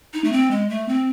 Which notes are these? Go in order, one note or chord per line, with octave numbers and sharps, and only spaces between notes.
D#4
A3
C4
G#3
A3
C4